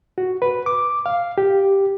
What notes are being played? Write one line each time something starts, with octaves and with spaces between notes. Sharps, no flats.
F#4
B4
D6
F5
G4